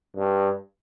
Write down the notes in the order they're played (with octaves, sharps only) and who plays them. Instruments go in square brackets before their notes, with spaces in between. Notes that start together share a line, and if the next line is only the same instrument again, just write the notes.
[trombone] G2